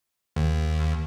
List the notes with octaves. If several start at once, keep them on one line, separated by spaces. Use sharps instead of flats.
D#2